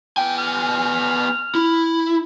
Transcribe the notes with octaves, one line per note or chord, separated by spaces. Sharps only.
B3 G5 G#5
F6
E4